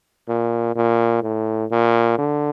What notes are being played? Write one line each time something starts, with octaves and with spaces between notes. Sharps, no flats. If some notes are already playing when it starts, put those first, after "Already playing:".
A#2
A#2
A2
A#2
D3